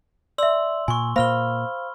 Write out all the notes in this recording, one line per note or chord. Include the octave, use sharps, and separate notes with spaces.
D5 E5 C6 E6 F#7
A#2 G#5 C6 C#6
A#2 A#3 C5 F5 B5 F6 G7